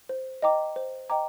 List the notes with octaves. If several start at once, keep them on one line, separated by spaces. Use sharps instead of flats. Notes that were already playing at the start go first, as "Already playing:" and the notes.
C5
D#5 G5 A#5 D6
C5
D#5 G5 A#5 D6